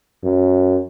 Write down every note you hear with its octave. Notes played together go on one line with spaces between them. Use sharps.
F#2